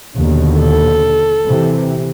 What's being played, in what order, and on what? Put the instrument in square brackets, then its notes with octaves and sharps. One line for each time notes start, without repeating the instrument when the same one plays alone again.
[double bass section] D#2 B2 D3
[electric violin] A4
[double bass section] C3 E3